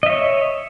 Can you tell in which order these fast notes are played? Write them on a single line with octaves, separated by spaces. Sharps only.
D#5 E5 C#5